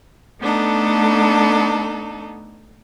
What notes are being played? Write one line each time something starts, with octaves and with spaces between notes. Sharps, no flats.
A3 B3 D4 D#4 A4